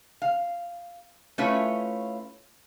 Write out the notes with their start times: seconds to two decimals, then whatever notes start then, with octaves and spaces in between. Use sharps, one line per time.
0.22 F5
1.38 A3 C#4 E4 F4 B4 C#5